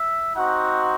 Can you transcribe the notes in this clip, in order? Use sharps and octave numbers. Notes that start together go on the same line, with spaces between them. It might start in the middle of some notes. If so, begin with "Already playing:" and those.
Already playing: E5
C4 D#4 F#4 F#5